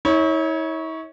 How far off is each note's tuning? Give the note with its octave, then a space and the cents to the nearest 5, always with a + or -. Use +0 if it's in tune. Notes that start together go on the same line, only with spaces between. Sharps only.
E4 -45 C#5 +0